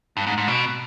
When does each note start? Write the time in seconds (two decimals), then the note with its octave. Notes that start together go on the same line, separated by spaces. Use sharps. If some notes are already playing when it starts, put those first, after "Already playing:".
0.17 G2
0.27 G#2
0.38 G#2
0.48 B2